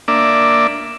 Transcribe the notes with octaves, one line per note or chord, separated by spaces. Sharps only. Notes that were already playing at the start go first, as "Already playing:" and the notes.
A#3 D4 D5 E5